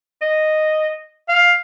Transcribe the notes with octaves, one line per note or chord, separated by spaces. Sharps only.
D#5
F5